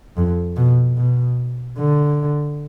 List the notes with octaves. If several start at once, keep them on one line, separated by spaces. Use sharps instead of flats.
F2
B2
B2
D3